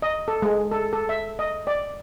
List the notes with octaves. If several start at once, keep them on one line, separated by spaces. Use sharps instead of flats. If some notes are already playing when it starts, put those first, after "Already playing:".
D#5
A4
G#3
A4
A4
E5
D#5
D5